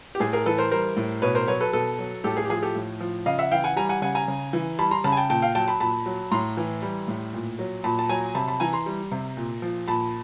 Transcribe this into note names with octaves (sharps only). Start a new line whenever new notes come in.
G4
A2 G#4
G#4 A#4
E3 A4 B4
A#4 C5
G3 A#4 C5
A2
B2 B4 C#5
A#4 C5
F#3 B4 C#5
A4 B4
B2 A4 B4
F#3
A2 G4 A4
G#4
G4
F3 G#4
G4 A4
A2
F3
C#3 D#5 F5
E5 F#5
E3 F5 G5
F#5 G#5
G3 G#5 A#5
F#5 G#5
C#3 F#5 G#5
G#5 A#5
C#3
E3
G3 A5 B5
A#5 C6
C#3 A5 B5
G#5
G5 A5
A#2 G5 A5
F5 G5
F#3 G5 A5
A5 B5
A#2 A5 B5
F#3
A2 A#5 C6
E3
G3
A2
A#2
F#3
A#2 A5 B5
A5
F#3 G#5 A#5
C3 A5 B5
A5 B5
E3 G#5 A#5
A#5 C6
G3
C3
A#2
F3
A#2 A5 B5